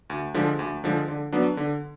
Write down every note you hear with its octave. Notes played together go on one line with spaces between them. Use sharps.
D2
D3 F3 G#3
D2
D3 F3 G#3
D3
F#3 B3 D4
D3